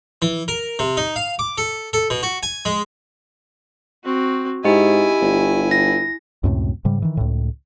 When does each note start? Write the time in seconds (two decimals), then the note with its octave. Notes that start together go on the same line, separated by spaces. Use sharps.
0.22 E3
0.48 A#4
0.79 C3
0.97 D#4
1.16 F5
1.39 D6
1.58 A4
1.93 A4
2.10 B2
2.23 F#4
2.43 G#5
2.65 G#3
4.04 C4 F#4
4.65 G#2 E4 G4 D#5 G#5
5.22 G1
5.71 A#6
6.44 C#2 F#2 A2 C3
6.85 G#2 C#3 G3
7.02 D#3 E3
7.17 C#2 A2